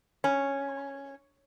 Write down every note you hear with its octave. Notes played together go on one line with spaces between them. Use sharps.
C#4